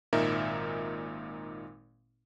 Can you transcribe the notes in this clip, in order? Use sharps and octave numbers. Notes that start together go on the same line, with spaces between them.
G#1 A#2 D#4 A#4 E5